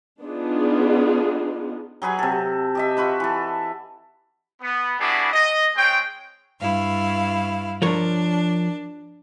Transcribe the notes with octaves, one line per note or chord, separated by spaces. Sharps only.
B3 D4 D#4 F4 G#4
F#3 G#4 B4 G#5
C3 A4
G4 D#5 E5
F4 F#4 B4 E5
E3 A4
B3
G3 B3 D4 E4 F#4 G#4
D#5
G#3 C4 C#5 G5
G2 E4 F5
F3 D4 A#4 C#5